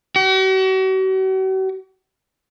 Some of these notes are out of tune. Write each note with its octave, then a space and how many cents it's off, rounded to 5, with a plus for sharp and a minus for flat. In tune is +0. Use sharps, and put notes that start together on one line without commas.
F#4 +45